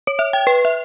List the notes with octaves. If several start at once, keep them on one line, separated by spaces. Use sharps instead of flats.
C#5
E5
G5
B4
E5